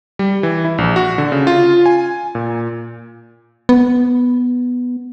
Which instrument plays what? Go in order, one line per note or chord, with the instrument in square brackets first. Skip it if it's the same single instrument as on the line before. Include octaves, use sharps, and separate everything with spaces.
[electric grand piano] G3
E3
E4
A#1
F#4
D3
C#3
F4
G#5
A#2
[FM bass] B3